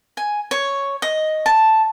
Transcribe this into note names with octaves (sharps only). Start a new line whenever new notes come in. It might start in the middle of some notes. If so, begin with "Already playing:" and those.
G#5
C#5
D#5
A5